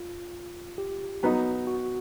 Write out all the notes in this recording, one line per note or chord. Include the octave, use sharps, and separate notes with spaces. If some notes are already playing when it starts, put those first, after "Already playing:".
Already playing: F4
G4
F#3 B3 D#4 F#4
F#4